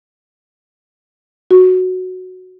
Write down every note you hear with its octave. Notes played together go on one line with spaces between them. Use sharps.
F#4